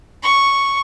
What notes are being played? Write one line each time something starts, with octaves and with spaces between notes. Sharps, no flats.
C#6